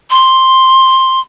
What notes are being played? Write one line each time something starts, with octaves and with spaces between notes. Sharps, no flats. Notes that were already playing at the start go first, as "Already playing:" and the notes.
C6